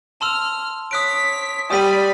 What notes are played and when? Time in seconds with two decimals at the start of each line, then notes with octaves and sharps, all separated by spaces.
0.21 A5 C6 E6 F6
0.91 C#5 D#6 F#6 B6 D7
1.70 G3 D5 B5 D#6 B6 D#7